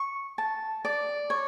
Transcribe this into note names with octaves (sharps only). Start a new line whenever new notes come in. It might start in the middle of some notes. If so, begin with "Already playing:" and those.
Already playing: C#6
A5
D5
C#5